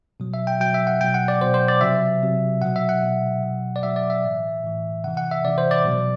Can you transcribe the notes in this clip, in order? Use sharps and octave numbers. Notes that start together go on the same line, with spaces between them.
B2 F#3
E5
G5
B2 F#3 G5
E5
F#5
B2 F#3 G5
F#5
D5
B2 F#3 C5
C5
D5
C3 F#3 E5
C3 F#3
B2 F#3 F#5
E5
F#5
B2 F#3
B2 F#3
D5
B2 F#3 E5
D5
E5
A2 E3
A2 E3
C3 E3 F#5
F#5
E5
C3 E3 D5
C5
D5
B2 F#3